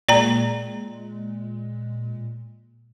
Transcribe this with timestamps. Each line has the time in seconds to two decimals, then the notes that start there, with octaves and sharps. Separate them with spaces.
0.09 A#2 G#3 D5 G5 A#5